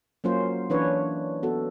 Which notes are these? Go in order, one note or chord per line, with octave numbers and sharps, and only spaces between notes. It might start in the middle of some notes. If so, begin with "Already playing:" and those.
F#3 A#3 C#4 F4 C5
E3 C#4 D4 B4 C#5
B3 F#4 A4